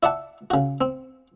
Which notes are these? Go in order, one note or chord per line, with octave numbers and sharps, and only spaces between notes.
E4 D5 E5 F#5 A5
C#3 F#4
C4